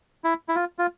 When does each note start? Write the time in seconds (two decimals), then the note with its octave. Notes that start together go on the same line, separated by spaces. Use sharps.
0.24 E4
0.49 E4
0.55 F4
0.79 F4